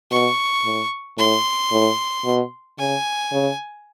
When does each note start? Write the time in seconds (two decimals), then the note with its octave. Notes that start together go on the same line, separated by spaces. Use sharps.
0.11 B2 C#6
0.64 A2
1.18 A2 C6
1.72 A2
2.25 B2
2.79 C#3 G#5
3.32 C#3